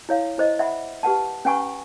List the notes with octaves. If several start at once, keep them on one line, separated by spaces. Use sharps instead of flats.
E4 C#5 F5
E4 C5 D#5
E5 F#5 B5
G4 B4 F#5 A5
C#4 B4 F#5 G#5 A#5 C#6